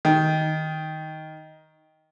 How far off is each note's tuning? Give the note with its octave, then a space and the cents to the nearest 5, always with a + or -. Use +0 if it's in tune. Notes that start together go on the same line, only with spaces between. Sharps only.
D#3 +10